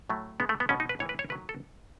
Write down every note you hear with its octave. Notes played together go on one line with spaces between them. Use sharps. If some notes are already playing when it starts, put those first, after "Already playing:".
A2 F#3 A3
C#3 G#3 B3
A3
B3
B2 A3 C#4
D#4
B4
A2 E3 G#3 C#5
B4
C#5
D#3 F#3 A3 B4
A4